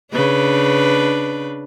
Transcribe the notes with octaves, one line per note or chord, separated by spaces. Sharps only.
C#3 D4 B4